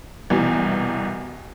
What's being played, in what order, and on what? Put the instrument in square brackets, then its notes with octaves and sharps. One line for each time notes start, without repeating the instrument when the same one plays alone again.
[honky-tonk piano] C2 B2 E3